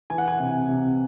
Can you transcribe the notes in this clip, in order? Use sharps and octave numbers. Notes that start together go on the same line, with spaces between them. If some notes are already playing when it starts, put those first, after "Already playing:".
E3 G#5
F#5
G#5
C3
C3